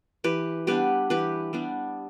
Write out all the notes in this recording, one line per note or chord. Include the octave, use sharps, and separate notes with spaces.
E3 G4 B4
G3 B3 D4 G4 B4
E3 G4 B4
G3 B3 D4